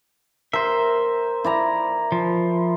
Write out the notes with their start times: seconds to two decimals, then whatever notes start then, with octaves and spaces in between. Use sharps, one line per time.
0.53 A#4 C5 E5
1.44 E4 D5 A#5
2.12 F3